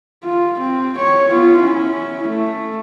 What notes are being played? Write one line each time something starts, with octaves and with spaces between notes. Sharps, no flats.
F4
C4
C#5
B3 F4
C#4 E4
A3